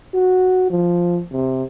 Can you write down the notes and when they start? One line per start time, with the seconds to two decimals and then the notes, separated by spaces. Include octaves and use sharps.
0.14 F#4
0.70 F3
1.33 C3